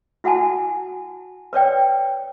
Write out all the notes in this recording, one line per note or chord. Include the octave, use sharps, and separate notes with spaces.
E4 F#4 F#5 G#5 A5
B4 C#5 D5 G5